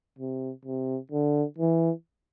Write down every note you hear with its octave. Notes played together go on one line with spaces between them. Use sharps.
C3
C3
D3
E3